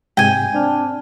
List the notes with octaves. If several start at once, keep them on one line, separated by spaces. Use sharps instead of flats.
G#2 C3 G#3 G5 G#5
C4 D4 F6